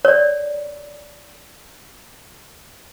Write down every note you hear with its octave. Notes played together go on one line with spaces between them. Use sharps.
C#5 D5